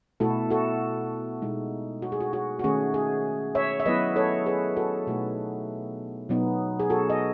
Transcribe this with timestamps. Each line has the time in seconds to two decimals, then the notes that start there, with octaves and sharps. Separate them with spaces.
0.20 B2 A3 E4 F#4 A4
0.50 F#4 A4
1.42 B2 G#3 D#4
2.02 F#4
2.12 G#4
2.20 F#4
2.33 F#4
2.59 F#4
2.64 D#3 A3 C#4 G#4
2.94 G#4
3.55 C#5 E5
3.80 E5
3.86 F#3 B3 E4 B4 D#5
4.16 A4 C#5
4.46 G#4 B4
4.77 F#4 A4
5.07 B2 A3 D#4 F#4
6.29 B2 F#3 B3 D#4
6.80 G#4
6.90 F#4 A4
7.10 D#5